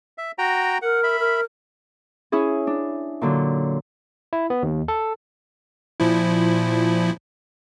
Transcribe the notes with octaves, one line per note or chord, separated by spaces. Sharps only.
E5
F#4 G5 A#5
A#4 F#5
E5 B5
A#4
C#4 E4 G#4
D4
A#2 D3 F#3
E4
B3
D#2
A4
A#2 F3 E4